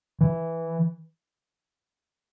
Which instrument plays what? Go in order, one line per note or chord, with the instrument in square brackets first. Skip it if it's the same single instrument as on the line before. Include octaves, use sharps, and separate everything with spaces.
[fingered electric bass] E3